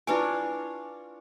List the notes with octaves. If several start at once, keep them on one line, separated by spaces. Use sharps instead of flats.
D4 E4 F4 B4 C#5 G#5